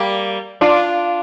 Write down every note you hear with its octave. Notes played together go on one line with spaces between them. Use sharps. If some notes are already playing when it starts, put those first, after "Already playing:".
Already playing: G3 A#3
D4 F4